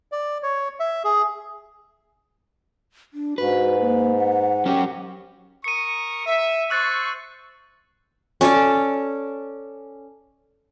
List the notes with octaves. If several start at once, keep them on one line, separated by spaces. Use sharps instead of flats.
D5
C#5
E5
G#4
D4
G#2 F#4 B4
A#3
F#5
F#3 C#4 G4
A#4 C#6 D#6 C#7 D#7
E5
C5 C#6 E6 F#6 A6
C#4 A4 C#5 D5